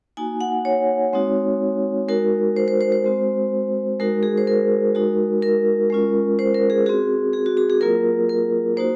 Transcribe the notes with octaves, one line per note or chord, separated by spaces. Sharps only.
A#3 D#4 F#4 G#5
F#5
C#5
G#3 C4 D#4 F#4
G#3 D#4 F#4 A#4
C5
C5
C5
C5
G#3 C4 F#4
G#3 D#4 F#4 A#4
G#4
C5
A#4
G#3 D#4 F#4
A#4
G#3 C#4 F4
C5
A#4
G#4
C4 F#4 G#4
G#4
F#4
G#4
G#4
F#3 A#3 F4 A#4
A#4
A#3 D#4 F#4 C5